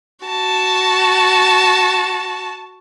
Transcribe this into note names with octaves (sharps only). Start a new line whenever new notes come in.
F#4 A5